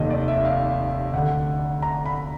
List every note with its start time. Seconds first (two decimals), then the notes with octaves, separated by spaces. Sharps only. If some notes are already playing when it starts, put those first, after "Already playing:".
Already playing: F1 D#2 D#3 D#5
0.10 D5
0.28 E5
0.45 F5
1.14 D2 D3 F#5
1.82 A#5
2.06 B5